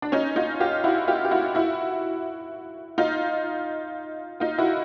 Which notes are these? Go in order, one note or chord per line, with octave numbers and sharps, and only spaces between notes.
D4
C#4 D#4
D#4 F4
F4 G4
E4 F#4
F4 G4
G4
E4 F#4
E4 F#4
D#4 F4
D#4 F4
E4 F#4